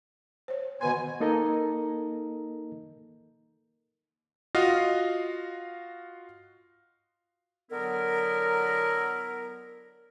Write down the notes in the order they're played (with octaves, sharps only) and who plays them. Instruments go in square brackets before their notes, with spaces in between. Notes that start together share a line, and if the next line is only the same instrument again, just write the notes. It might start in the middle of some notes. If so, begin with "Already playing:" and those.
[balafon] C5 C#5
[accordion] B2 G#5 [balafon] D#3 B4 C6
[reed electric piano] A#3 D#4 A4 A#4 D#5 A#5
[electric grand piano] F4 F#4 D#5 F5
[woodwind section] D3 F#3 B3 E4 A#4